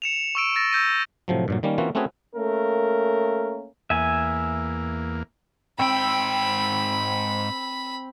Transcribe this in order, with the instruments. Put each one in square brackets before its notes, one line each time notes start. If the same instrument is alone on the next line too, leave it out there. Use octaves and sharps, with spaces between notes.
[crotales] C#7 E7 F7
C#6 E6 D7
E6 A6 A#6
E6 G6 A#6 D#7
[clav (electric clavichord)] A2 C3 F3 F#3
G2 A#2 F#3
D#3 G3 A#3 C#4
E3 A#3 C4 C#4 F4 F#4
A3 C4 C#4 F#4 G#4 B4
[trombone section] A3 A#3 C#4 A#4
[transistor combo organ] E2 A#3 [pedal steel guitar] E5 G#5
[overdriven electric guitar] G#2 G5 [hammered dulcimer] C4 [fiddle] B5